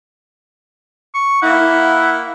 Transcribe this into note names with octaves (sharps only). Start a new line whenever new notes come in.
C#6
A#3 E4 F#5